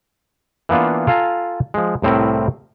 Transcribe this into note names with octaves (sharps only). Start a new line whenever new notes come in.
E3 A#3 B3 D4 F4
F4 A4 F5 G#5 A#5
F3 G#3
C2 A2 C4 E4 A#4